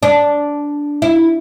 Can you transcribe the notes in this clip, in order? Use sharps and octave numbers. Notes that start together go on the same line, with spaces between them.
D4
E4